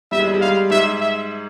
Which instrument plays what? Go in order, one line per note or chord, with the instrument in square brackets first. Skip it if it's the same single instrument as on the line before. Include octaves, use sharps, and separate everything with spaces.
[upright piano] G3 [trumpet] E5
[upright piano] G#3
G3
G#3
[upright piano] G3 [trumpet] F5
[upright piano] G#2 G#3 [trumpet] E5
[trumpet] E5